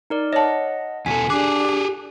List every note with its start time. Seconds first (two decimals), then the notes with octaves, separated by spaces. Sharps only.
0.10 D#4 A#4 D5
0.33 C#5 D#5 F#5 A5
1.06 E2 B2 A4 G#5 B6
1.30 D4 G4 G#4 D6 F#6